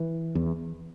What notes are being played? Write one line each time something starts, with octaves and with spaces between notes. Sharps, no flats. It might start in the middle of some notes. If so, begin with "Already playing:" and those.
Already playing: E3
E2